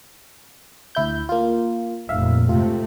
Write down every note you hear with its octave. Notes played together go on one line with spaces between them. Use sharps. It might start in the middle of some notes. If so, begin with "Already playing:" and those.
D2 E4 G6
A#3 F4
F1 D#2 A#2 E5 F5
G#2 C3 A3 F4